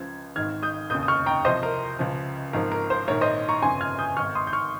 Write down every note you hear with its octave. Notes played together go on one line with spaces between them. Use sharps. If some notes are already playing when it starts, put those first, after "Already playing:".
Already playing: C#2 C#3 F3 G#6
G#1 G#2 D#3 F6 G#6
D#6 G6
F1 D#2 C#3 D#6 G6
D#6
C#6 F6
G5 A#5
C2 C3 F3 C5 D#5
A#4
C#2 C#3 F3
G#1 G#2 F3 A#4
A#4
C5
A#1 G#2 D#3 A#4 C#5
C5 D#5
A#5 C#6
G1 F2 C#3 F3 G#5 C6
F6 G#6
D#6 G6
G#1 G#2 D#3 C#6 F6
C6 D#6
G6
C#6 F6